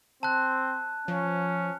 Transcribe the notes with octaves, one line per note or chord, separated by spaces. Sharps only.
C4 A5 F#6
F3 C#4